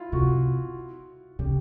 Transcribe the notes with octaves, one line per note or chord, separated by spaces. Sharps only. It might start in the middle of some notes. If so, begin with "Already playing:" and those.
Already playing: E4 F4
C3 F#4
C#3 G4